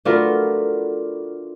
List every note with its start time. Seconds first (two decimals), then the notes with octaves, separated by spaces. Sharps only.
0.05 A3 D4 F4 F#4 A#4 B4